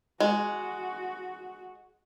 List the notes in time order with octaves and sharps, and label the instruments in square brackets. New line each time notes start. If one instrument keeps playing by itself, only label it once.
[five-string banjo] G#3 [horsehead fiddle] F#4